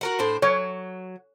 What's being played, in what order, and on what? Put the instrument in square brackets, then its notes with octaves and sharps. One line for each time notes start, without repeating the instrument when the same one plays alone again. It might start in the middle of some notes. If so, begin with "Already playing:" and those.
[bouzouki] F#4 A#4 F#5
A2 D4 C5
[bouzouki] F#3 [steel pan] C#5